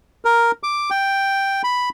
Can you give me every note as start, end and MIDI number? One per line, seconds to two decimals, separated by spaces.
0.25 0.51 70
0.63 0.90 86
0.91 1.62 79
1.64 1.89 83